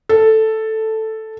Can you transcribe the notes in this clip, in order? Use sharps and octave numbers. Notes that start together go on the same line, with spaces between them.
A4